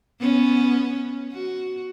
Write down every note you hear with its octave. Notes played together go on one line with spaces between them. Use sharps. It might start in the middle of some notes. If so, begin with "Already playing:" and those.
B3 C#4
F#4